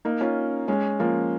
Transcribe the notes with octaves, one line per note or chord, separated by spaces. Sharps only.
A#3 D#4
C#4 F4
G#3 C#4
F3 A#3